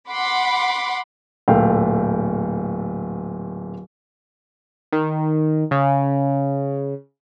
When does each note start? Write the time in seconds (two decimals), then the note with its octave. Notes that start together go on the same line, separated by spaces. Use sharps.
0.11 F#5 B5 C6 D6
1.48 D1 A#2 A3 F5 G5
4.92 D#3
5.71 C#3